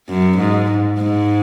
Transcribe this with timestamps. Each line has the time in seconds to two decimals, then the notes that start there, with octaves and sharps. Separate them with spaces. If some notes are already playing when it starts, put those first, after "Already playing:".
0.08 F#2
0.38 G#2
0.98 G#2